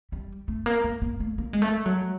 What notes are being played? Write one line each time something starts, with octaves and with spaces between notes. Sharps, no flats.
G3
A3
A#3
A#3
A#3
A3
A#3
G#3
A3
F#3